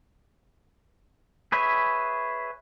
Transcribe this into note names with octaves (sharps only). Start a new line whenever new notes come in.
G#4 B4 C#5 E5